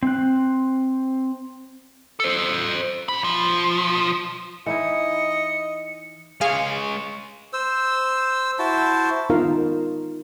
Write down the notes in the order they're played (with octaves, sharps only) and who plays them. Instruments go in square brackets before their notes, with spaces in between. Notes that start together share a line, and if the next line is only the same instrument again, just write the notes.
[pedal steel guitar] C4 F#6
[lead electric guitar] A4 C5
F#4 B5
B1 F3
[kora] E3 D#4 E4 [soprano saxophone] D#5 [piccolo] C#7
[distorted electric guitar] G#3 C#5 [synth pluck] G#4 F5
[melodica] C5 E6
E4 F#4 C5 A5
[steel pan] B3 D#4 F4 A#4 F5